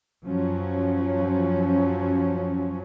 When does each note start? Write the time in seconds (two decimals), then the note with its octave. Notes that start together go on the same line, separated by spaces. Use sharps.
0.25 F#2 F3 F#3 C#4